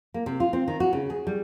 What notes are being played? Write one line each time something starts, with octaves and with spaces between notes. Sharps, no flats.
A#3
C3
F4
C4
D#3
F#4
C#3
G#4
G3